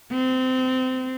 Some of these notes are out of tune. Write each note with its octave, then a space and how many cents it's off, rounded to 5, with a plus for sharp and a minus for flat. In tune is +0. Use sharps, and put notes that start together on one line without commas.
C4 -25